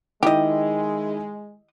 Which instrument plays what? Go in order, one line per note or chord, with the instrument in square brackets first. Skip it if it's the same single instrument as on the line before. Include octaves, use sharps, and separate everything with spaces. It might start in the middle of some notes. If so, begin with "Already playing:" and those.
[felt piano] D#3 E4 [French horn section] G#3 [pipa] G4 D#5